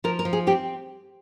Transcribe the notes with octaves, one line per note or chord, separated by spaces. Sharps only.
F3 A#4
A#4
F3
G#4
C4 G4